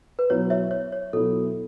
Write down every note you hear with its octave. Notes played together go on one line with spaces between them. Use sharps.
B4
B2 F#3 B3 E4 C#5
C#5 E5
C#5
C#5
B2 F#3 B3 E4 A4